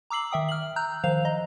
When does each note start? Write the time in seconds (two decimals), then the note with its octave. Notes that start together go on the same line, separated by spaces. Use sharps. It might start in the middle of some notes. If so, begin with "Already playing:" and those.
0.10 A#5 D6 E6 C7 F#7
0.31 D#3 E5 G5 D#6
0.49 F6 F#7
0.76 A#5 E6 F#6 G6
1.04 D#3 F3 C5 F5 F7
1.25 D#5 A#5